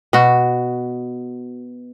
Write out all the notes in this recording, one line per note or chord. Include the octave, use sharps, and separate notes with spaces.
B2 F#4